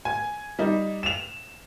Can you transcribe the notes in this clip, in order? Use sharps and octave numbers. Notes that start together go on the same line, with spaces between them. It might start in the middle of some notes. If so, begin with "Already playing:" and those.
G#5
G3 D#4
E7 F7